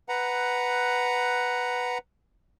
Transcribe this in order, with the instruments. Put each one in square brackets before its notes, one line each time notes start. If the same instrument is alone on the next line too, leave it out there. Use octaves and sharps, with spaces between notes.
[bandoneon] B4 F#5 A#5